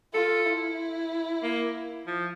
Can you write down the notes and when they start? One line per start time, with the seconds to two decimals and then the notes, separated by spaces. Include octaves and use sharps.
0.14 F4 A4
0.46 E4
1.43 A#3
2.07 F3